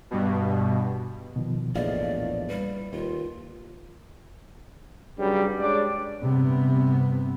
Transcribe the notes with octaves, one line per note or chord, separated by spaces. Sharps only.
G2 B2
B2 D#3 F3
A#1 E2 A2 E4 D5 D#5 F5
G3 B4
D#2 F4
G2 C#3 F#3 G3
G#3 D4 C#5 D5
G2 C3 B3